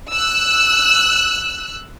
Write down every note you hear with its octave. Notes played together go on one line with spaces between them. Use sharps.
E6 F#6